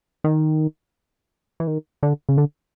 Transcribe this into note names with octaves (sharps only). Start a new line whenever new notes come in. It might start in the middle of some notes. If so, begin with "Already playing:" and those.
D#3
E3
D#3
D3
C#3
D3